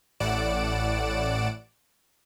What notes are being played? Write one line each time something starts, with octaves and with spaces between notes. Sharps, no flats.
A1 A2 D5 F#5 D7 E7